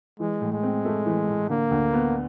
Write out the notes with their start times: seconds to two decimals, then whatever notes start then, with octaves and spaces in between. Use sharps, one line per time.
0.20 E3 G#3
0.41 A2
0.52 G#3
0.63 C4
0.85 A3
1.06 E3
1.28 A2
1.49 D3 A#3
1.71 D2
1.93 B3